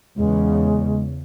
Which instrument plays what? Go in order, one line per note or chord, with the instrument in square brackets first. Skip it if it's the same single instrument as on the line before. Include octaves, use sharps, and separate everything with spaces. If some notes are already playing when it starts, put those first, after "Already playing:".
[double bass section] E2 C#3 [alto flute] G#3